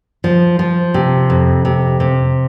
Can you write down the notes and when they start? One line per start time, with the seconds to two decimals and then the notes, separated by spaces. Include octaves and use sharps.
0.24 F3
0.59 F3
0.94 C3
1.30 F2
1.65 C3
2.00 C3